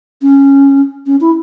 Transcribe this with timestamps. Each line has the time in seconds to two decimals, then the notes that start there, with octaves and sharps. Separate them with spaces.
0.22 C#4
1.06 C#4
1.21 E4